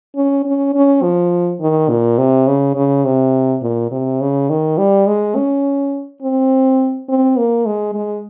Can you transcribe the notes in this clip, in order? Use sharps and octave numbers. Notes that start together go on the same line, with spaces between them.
C#4
C#4
C#4
F3
D#3
A#2
C3
C#3
C#3
C3
A#2
C3
C#3
D#3
G3
G#3
C#4
C4
C4
A#3
G#3
G#3